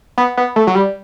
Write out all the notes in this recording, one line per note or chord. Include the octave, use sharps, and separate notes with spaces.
B3
B3
A3
F#3
G3